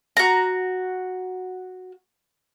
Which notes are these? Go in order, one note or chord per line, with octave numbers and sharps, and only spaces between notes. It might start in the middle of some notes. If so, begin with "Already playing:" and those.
F#4 A#5